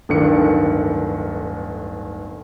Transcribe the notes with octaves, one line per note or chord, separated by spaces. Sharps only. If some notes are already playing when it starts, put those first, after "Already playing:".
D1 G1 D3 D#3 D4 C#7